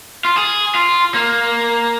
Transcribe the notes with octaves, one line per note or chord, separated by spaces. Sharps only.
F4
G#4
F4
A#3